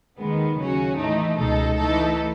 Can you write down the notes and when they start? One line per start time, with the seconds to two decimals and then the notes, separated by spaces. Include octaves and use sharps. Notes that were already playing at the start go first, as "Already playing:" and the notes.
0.18 D#2 D#3 G#3 B3
0.58 D#2 C#3 F#3 C#4 F#4
0.97 A2 E3 A3 D#4
1.37 C#2 B2 G#3 D#4 A4
1.77 E3 A3 D#4 A4